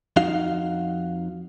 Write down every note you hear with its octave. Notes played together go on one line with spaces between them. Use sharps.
F2 D#4 F#4 F5